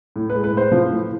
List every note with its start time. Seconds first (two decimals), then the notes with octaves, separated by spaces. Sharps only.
0.16 A2
0.30 B4
0.34 G#3
0.44 B4
0.53 A2 C5
0.72 F3
0.91 A2